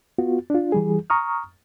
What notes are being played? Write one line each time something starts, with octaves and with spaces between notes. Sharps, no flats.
B3 F4 F#4
D4 F4
E3 G3 G#4
A#5 C#6 D#6 F6